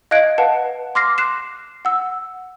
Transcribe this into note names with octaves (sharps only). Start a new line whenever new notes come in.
D#5 F5 F#6 G#6 D7
B4 F5 F#5 A5
C6 D6 F6 A#6 C7
F#6 C7 E7
F#5 E6